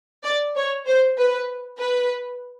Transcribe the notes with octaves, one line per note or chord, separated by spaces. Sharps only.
D5
C#5
C5
B4
B4